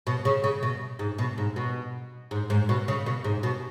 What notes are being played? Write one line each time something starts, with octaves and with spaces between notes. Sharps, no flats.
B2
C#3
C#3
B2
G#2
B2
G#2
B2
G#2
G#2
B2
C#3
B2
G#2
B2